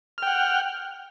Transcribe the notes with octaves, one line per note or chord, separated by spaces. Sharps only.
F#5 G5 F6